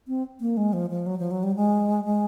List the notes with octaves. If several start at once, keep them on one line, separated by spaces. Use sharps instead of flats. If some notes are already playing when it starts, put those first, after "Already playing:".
C4
A#3
G#3
F3
F3
F#3
F3
F#3
G3
G#3
G#3